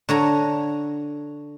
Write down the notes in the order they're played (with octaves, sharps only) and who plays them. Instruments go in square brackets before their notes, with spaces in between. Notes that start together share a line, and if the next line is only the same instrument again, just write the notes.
[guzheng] D3 C#5 A#5